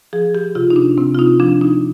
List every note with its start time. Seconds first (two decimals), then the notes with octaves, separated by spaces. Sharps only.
0.13 F3 G#4
0.35 G4
0.55 C3 F4
0.70 D#4
0.76 D4
0.97 C3 C4
1.14 F4
1.19 D#4
1.40 F3 D4
1.61 D#4